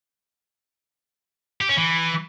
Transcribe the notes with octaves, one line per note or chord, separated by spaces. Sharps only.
G4
C#4
E3